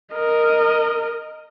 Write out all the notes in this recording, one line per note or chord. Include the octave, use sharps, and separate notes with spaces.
A#4 D#5